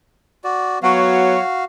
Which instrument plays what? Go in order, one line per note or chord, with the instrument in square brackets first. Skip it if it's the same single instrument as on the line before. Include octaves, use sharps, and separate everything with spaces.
[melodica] F#4 D5
[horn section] F#3 B3 C#5 [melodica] F#4 F5